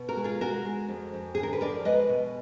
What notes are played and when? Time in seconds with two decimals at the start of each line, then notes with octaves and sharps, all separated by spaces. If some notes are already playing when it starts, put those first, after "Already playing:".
Already playing: B2
0.08 F#4 A#4
0.16 G#3
0.24 F4 G#4
0.41 G#3 F#4 A#4
0.65 G#3
0.88 F2
1.14 F2
1.35 D3 G#4
1.43 A#4
1.53 B4
1.61 F2 A#4 D5
1.85 G#3 B4 D#5
2.09 B2